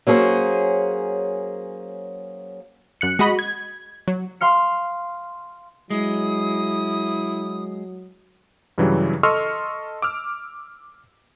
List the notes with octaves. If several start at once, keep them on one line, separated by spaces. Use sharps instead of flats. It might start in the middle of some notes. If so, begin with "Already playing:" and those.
F#3 A#3 C#4 G#4 C5
F#2 F#6 C#7
G#3 F#4 D#5 B5
G#6
F#3
F5 C6 F6 C#7
F#3 G#3 E4 D#6
G2 C#3 E3 F#3 G3
A4 D#5 C6 C#6 E6 F6
D6 E6 F6